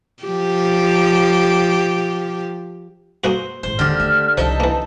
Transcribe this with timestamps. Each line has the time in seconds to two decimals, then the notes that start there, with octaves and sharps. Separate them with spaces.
0.23 F3 G4
3.24 G#3 A#3 F#4 C5
3.63 A1 G#2 C5
3.79 D#2 D3 D#3 G4 F6
4.00 A3 E5
4.38 C2 F3 D#4 D#5 E5 A5
4.60 E3 A#3